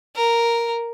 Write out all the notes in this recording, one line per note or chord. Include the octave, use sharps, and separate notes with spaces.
A#4